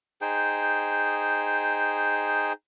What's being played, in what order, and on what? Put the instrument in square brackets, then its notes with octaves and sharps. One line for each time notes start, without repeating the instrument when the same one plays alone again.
[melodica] D#4 G#4 C5 G5